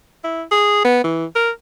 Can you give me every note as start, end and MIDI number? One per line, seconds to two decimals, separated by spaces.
0.24 0.43 64
0.51 0.80 68
0.85 1.02 59
1.04 1.25 52
1.35 1.50 70